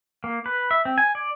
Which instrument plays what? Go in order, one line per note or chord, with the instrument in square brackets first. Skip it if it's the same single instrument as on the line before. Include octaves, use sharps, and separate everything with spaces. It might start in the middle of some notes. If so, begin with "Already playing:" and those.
[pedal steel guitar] A#3
B4
E5
C4
G#5
D5